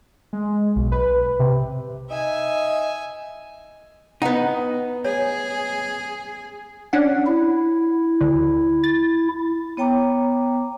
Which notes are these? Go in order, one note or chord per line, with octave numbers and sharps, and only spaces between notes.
G#3
B1
B4
C3
D#4 E5 G#5
B3 D#4 F#5 G5
G#4 C#5
C#4 D4 F#5
E4
D2
A6
B3 C#5 G5 A#5 D6